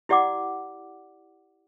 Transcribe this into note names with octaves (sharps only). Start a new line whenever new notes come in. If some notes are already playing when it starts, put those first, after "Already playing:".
E4 G4 D5 F#5 D6